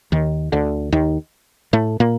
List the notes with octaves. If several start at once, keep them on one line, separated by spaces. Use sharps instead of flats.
D#2 D#3
D2 D3
D#2 D#3
A2 A3
A#2 A#3